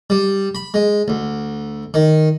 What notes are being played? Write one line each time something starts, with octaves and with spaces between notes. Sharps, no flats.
G3
B5
G#3
D2
D#3